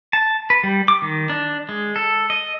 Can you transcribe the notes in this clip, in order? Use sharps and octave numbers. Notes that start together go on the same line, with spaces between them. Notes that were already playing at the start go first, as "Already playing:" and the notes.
A5
B4
G3
D6
D#3
D4
G#3
A4
D#5